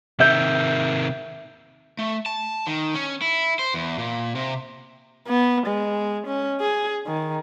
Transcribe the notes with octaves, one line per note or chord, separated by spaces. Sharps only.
C3 D#3 E5 G6
A3
A5
D#3
C#4
E4
C5
E2
A#2
C3
B3
G#3
C#4
G#4
D#3